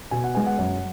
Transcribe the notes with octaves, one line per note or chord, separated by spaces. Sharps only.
B2 G#5
F#5
G#3 B3 G#5
F#5
F#2